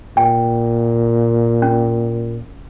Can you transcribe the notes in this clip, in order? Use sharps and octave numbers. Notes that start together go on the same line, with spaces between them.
A#2 G5
C#4